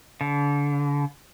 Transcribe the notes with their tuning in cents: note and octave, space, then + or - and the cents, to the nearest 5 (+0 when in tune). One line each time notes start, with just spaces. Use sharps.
D3 -35